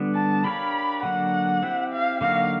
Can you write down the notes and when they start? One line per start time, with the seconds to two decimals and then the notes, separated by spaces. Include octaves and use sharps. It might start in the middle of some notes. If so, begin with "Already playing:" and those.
Already playing: D3 G3 B3 D4
0.15 A5
0.44 D4 G4 A#4 C#5 F5 B5
1.03 D3 F#3 A#3 D4 F#5
1.63 C4 E4 G4
1.92 F5
2.21 D3 F#3 A#3 D#4 F#4 F5